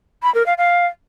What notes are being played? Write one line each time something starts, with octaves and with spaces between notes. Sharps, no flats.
B5
A#4
F5
F5